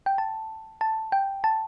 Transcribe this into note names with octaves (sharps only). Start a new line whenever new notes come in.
G5
A5
A5
G5
A5